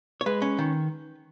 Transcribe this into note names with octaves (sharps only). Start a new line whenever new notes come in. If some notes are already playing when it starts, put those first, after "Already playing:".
C#5
G#3 B4
C#4
D#3